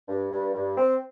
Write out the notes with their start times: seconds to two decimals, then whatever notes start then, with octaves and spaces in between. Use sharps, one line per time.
0.09 G2
0.31 G2
0.54 G2
0.77 C4